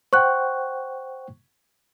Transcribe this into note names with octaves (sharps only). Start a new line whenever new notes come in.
C5 F#5 G5 C#6 F#6